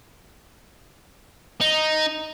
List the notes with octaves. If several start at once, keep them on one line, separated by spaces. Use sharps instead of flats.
D#4